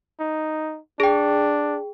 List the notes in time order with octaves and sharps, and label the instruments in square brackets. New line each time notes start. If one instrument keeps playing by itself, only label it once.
[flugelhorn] D#4
[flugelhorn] D4 [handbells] G#4 G5